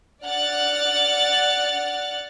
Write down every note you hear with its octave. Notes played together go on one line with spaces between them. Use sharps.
D5 F#5 F6 F#6 A6